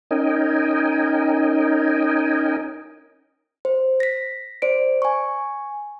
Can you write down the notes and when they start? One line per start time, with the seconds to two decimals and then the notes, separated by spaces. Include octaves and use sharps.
0.11 C#4 D#4 A#4 D#5 G5 G#5
3.65 C5
4.00 A#6 B6
4.62 C5 D5 D7
5.02 G#5 C#6